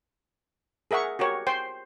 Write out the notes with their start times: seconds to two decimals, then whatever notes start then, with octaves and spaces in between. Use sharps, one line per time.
0.91 G#4 A#4 E5 F#5 C#6
1.19 F#4 G4 A#4 C#5
1.47 C5 G5 C6